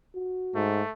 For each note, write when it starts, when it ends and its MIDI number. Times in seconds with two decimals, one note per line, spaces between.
0.14 0.68 66
0.55 0.82 44
0.55 0.91 57